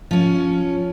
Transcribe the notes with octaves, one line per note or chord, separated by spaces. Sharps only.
F3 C#4